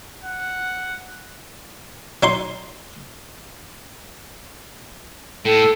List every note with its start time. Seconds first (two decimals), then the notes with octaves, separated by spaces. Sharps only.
0.23 F#5
2.23 F#3 D#4 C6
5.45 A2 A4